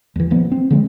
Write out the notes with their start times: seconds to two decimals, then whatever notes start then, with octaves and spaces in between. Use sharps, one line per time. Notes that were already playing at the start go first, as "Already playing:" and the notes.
0.16 E2 E3
0.30 D#1 F3 B3
0.52 C4
0.70 D3 F3 G#3 C4